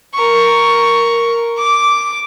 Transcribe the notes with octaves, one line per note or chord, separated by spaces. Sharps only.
A#4 C#6
D6